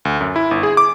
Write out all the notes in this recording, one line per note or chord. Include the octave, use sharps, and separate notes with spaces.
D2
F#2
E4
G1
G#4
D6